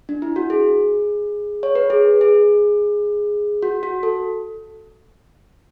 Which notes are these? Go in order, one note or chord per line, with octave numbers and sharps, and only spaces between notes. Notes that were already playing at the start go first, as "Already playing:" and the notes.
D4
E4
F#4
G#4
C#5
B4
G#4
G#4
F#4
F#4
A4